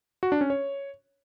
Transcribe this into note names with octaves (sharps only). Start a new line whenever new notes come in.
F#4
D4
C#4
C#5